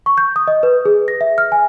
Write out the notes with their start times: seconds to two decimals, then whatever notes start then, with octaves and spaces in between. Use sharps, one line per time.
0.06 C#6
0.18 G6
0.36 D#6
0.48 D#5
0.63 B4
0.85 G#4
1.08 A#6
1.21 E5
1.38 F6
1.52 G#5